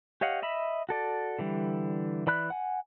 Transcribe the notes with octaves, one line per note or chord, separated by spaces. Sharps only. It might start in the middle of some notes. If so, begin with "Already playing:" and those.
G4 C#5 D#5 F5 F#5
D#5 E5 B5
F#4 A4 D5
D3 E3 G3
E3 D5 B5 F#6
F#5 G#5